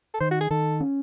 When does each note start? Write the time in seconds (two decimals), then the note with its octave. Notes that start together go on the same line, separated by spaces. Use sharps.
0.14 A4
0.20 D#3 C5
0.31 F#4
0.41 G#4
0.51 D#3 A4
0.80 C#4